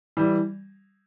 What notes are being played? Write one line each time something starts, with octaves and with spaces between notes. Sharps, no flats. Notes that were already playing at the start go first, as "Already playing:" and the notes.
E3 G3